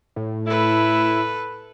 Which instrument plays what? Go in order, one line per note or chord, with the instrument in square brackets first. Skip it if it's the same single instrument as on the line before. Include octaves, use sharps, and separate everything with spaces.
[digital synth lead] A2
[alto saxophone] E4 [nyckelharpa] A4 B4